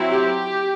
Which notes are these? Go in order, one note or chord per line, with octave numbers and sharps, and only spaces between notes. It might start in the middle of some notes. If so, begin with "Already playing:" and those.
Already playing: F#3 C4 E4
G4